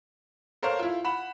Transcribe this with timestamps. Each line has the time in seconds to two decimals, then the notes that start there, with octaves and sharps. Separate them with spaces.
0.63 A4 A#4 C5 C#5 F5
0.79 E4 F4
1.04 F#5 B5 E7